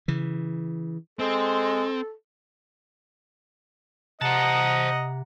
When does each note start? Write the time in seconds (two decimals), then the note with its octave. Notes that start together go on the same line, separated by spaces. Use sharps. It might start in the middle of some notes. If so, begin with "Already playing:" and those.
0.08 C#3 E3
1.19 G#3 C4 A4
4.22 C3 C5 D#5 F#5 A5 A#5